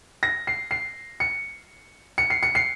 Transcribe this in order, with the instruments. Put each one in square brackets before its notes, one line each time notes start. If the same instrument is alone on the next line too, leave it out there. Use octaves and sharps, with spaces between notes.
[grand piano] A#6
C7
C7
C#7
C#7
C7
C#7
C7